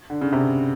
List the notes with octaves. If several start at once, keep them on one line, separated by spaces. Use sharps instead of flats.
D3
C#3
C3